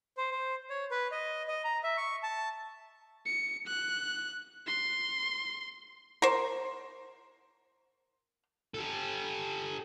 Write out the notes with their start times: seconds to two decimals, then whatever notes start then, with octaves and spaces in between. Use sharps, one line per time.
0.17 C5
0.31 C5
0.70 C#5
0.91 B4
1.12 D#5
1.48 D#5
1.64 A#5
1.83 E5
1.97 C#6
2.23 A5
3.25 C#7
3.67 F#6
4.67 C6
6.22 A#4 C5
8.74 G4 A4